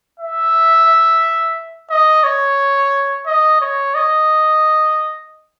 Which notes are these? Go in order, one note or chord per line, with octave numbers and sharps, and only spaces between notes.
E5
D#5
C#5
D#5
C#5
D#5